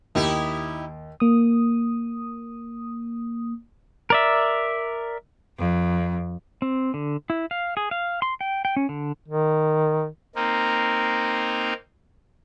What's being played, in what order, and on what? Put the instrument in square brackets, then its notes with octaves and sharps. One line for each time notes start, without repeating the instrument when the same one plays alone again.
[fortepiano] D#2 [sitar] D#4 E4 G4
[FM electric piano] A#3 D#6
[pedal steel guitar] A#4 D5 E5
[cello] F2
[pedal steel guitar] C4
D3
E4
F5
G#4
F5
C6
G5
G5
C#4
D3
[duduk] D#3
[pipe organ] A#3 C4 D#4 A#4